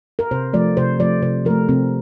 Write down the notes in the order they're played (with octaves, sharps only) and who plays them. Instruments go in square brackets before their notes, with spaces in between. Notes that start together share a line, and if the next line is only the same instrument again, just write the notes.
[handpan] A#4
C3 C5
F3 A3 D5
C3 C5
F3 A3 D5
C3 C5
F3 A3 A#4
C3 C4